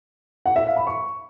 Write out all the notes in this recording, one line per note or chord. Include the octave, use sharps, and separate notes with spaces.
F#5
E5
F5
B5
C#6